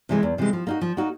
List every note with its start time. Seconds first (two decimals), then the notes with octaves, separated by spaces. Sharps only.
0.09 C3 E3 G#3
0.23 E2
0.38 C3 E3 G#3
0.53 F3
0.67 A#3 D#4 F#4
0.81 F3
0.97 A#3 D#4 F#4